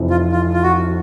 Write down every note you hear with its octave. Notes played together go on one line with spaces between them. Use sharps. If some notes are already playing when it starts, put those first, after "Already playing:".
Already playing: F1 F2 C3 E3
F4
F4
F4
F#4